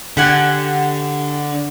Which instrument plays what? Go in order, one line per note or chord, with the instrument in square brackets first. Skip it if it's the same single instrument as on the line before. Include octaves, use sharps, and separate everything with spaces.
[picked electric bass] D3 [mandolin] G4 F#5 G#5